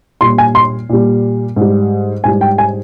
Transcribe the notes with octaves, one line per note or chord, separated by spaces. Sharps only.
A#2 G3 C6
G#5
C6
A#2 G3
G#2 G3
G#2 G3 G#5
G5
G#5